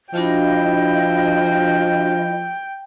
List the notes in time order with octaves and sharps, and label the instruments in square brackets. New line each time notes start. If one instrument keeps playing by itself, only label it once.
[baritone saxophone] F3 [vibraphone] D4 F#4 F5 [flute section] E4 D#5 [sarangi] G5